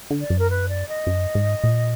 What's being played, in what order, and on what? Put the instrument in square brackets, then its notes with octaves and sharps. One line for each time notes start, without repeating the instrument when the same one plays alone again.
[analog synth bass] D3
[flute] D5
[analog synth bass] F#2
[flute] A#4
B4
D5
D#5
[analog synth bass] F#2
G#2
A#2